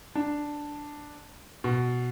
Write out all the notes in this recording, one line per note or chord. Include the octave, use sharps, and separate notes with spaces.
D4
B2